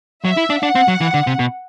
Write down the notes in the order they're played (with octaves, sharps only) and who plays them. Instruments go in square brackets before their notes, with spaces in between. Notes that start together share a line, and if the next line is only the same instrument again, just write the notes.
[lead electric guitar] F#3 [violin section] E5
[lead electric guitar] E4
D4
[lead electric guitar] D4 [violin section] F#5
[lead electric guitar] C4
F#3
E3
D3
C3
B2